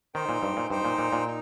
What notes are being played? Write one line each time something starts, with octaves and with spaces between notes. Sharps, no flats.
D#3 D#4 C5 G5
A#2
G2
A#2
G2 D#4 C5 G5
A#2
A#2
A#2
D#4